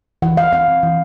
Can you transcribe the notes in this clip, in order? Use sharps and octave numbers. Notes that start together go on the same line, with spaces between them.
E3 F#5
E3 F5
C4 F5
E3
E3